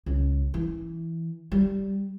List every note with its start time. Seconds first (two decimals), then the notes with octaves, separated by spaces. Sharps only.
0.06 C#2
0.54 E3
1.52 G3